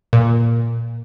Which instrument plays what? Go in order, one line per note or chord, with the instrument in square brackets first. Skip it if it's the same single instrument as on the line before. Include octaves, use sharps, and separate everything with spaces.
[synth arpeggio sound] A#2